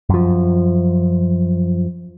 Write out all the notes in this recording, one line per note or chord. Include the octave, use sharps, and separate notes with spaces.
F#2 F3